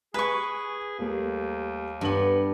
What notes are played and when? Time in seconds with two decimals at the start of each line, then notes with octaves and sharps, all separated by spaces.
0.14 G#4 B4 G#5 C#6
0.99 D#2 G3 A3 A#3
2.01 G2 B3 A5 F#7